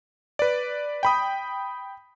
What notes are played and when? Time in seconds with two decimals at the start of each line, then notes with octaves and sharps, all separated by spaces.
0.39 B4 D5
1.03 G5 B5 D#6